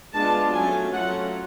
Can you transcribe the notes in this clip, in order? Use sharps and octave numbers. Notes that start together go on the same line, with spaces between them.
G#3 B3 D4 F4 A5
F#3 A3 C#4 G#5
F#3 A3 C#4 F4 F#5